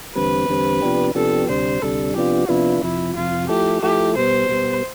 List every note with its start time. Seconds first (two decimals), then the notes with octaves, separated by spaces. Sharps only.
0.15 E2 D3 G3 C4 B4
0.48 E2 D3 G3 C4
0.82 C3 F3 B3 D4 G4
1.15 C3 F3 B3 D4 G4 A4
1.49 D2 C3 G3 D4 C5
1.82 D2 C3 G3 D4 A4
2.16 C3 F3 B3 D4 F4 G4
2.48 C3 F3 B3 D4 E4 F4
2.83 F2 C3 F3 E4
3.16 F2 C3 F3 F4
3.49 F3 A3 E4 G4 A4
3.82 F3 A3 E4 G4 A4
4.16 B2 G3 B3 C5
4.49 B2 G3 B3